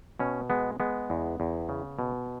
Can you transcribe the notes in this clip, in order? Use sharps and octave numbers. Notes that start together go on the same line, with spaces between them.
B2 C#4
G#3 B3
G#3 B3
E2
E2
C#3
B2